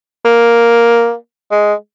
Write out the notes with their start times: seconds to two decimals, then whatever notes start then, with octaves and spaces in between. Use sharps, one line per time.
0.25 A#3
1.51 G#3